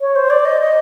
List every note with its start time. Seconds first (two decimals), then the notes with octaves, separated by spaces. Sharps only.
0.01 C#5
0.16 C5
0.30 D5
0.45 D#5
0.61 D#5